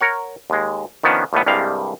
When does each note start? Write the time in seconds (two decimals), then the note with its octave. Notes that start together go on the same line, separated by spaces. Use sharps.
0.01 A#4 C#5 F#5
0.50 D#2 G#3
1.03 D#3 F3 B3 C#4 D4
1.33 D#2 A2 G3 A3 B3
1.46 C2 G2 G3 G#3 F5